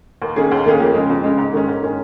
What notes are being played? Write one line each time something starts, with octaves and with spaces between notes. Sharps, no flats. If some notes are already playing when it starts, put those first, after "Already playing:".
D#2
D#3 A#3 C#4 G#4
D#2
D#3 A#3 C#4 G#4
F2
C#3 G#3
F2
C#3 G#3
G#2
D#3 G#3 C#4
G#2
D#3 G#3 C#4